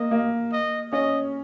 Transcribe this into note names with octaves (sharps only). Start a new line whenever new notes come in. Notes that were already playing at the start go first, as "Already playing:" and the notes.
Already playing: A#3 D#5
A#3
D#5
C#4 D#5